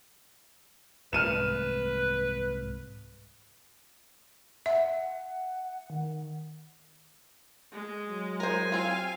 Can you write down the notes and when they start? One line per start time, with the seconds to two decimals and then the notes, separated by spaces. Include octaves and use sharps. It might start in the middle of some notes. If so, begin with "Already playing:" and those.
1.13 C2 G#2 A3 B4 F6 D#7 E7
4.66 E5 F#5
5.90 D#3
7.73 G#3
8.09 F#3
8.40 A#4 C5 G#5
8.72 C4 F4 F5